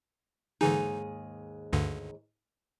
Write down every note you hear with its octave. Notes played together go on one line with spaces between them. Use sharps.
D#2 G#2 D3 E3 D#4 G#4
D2 G2 D3